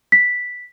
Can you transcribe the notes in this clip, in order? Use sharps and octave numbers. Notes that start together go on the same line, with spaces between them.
B6